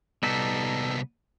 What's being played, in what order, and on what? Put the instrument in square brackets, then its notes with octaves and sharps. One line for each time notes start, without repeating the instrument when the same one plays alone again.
[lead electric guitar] C2 B3 [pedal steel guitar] G3 D#4 A4